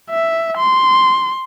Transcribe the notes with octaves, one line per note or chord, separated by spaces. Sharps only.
E5
C6